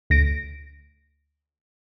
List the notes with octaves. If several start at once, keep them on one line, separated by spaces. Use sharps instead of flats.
D2 A#6 D7